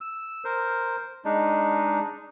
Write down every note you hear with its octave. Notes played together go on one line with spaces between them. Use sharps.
E6
A#4 C5
G#3 D4 D#4